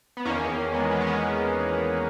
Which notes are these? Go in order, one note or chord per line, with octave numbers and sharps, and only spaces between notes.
B3
E2 D#3 A#3 C#4
G#3 B3
G#3 B3
C#4
G#3 B3